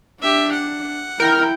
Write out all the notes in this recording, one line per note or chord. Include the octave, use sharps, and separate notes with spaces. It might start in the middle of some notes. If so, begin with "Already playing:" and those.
D4 G4 E5
F#5
E4 A#4 G5